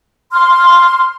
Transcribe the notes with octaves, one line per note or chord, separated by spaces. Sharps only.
C6 F6